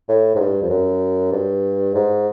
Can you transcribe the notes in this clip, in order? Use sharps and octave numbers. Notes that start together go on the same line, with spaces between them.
A2
G#2
G2
F2
F#2
G2
G#2